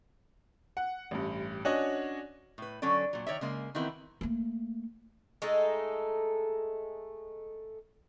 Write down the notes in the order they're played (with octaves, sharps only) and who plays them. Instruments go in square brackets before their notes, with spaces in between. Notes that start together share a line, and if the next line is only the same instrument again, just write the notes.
[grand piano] F#5
A1 G2
C#4 D4 F#4 C#5 D#5
[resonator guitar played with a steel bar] A2 B4
D3 F#3 C#4 A4 D5
A#2 F#3
D#3 C#5 D5 E5
C#3 G#3 A#3
D#3 E3 B3 C4 E4 A#4
[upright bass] A3 A#3
[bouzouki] G#3 A3 D#4 A4